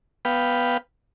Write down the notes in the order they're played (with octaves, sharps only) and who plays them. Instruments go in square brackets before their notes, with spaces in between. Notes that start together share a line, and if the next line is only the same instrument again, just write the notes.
[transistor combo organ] B3 B4 F5 G5